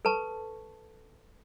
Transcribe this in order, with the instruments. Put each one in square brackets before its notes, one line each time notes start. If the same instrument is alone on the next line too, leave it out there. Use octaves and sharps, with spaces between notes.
[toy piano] A4 B4 A5 C#6